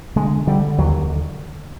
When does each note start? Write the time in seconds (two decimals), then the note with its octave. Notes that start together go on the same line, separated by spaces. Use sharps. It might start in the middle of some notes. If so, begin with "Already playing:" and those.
0.16 D3 G#3
0.47 D3 G3
0.78 D#2 F#3